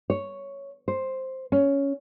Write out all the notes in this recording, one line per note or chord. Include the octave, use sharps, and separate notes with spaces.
C#5
C5
C#4